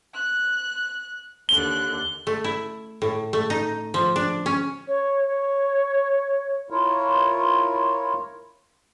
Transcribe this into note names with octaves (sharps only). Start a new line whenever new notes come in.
F#6
D#2 D3 F#6 G7
A3
E4
A2
A3
D#4
F3
D4
C#4
C#5
C#5
E4 F4 A#4 C#5